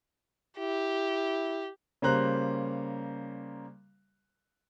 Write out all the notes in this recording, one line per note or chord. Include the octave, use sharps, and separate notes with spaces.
E4 G4
C#3 G3 A#3 C5 A#5 F#6